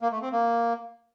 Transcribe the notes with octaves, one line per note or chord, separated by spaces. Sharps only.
A#3
A3
C4
A#3